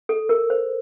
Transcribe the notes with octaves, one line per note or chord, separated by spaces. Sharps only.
A4
A#4
C5